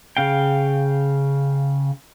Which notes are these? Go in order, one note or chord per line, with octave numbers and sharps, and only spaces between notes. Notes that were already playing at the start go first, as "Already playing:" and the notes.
C#3 F5 G5